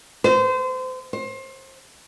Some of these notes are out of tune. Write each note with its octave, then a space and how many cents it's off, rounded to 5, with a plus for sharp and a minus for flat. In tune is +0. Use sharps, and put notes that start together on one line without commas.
C5 -30
C5 +30